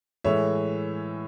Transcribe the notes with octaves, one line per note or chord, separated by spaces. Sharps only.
A2 E3 G#3 C#5 E5